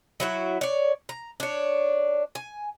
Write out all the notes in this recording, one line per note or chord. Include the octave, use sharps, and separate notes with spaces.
F#3 E4 F#4
C#5 D5
A#5
D4 C#5
G#5